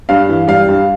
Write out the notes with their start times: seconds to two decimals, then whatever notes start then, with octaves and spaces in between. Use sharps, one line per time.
0.09 G2 F5
0.29 E3
0.48 G3 F5
0.68 G2